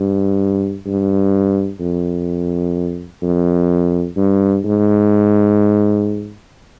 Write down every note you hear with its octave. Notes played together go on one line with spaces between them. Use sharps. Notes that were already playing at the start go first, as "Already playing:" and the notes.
Already playing: G2
G2
F2
F2
G2
G#2